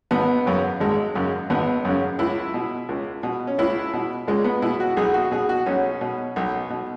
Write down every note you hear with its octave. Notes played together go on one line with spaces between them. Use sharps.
G#1 B3
F#2 C#3
G#1 G#3
F#2 C#3
G#1 B3
F#2 C#3
C#2 E4
B2
C#2
B2
C#4
C#2 E4
B2
C#2 G#3
B3
B2 E4
F#4
B1 G#4
F#4
B2 G#4
F#4
B1 C#4
B2
B1
B2